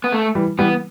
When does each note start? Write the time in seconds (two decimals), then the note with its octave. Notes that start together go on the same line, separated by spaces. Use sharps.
0.04 B3
0.12 A3
0.35 E3 G3
0.59 E3 G3 B3